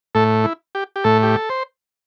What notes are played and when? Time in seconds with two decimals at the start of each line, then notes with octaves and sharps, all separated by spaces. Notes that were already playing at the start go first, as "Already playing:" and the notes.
0.15 A2 A3 A4
0.44 E4
0.75 G4
0.96 G4
1.04 A2 A3 A4
1.23 G4
1.36 A4
1.50 C5